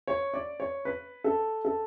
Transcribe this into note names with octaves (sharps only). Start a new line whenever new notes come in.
C#5
D5
C#5
B4
A4
A4